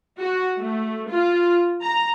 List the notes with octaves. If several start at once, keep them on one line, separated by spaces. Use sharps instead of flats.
F#4
A3
F4
A#5